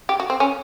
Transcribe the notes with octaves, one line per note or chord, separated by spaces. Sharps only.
G4
F#4
C4
C#4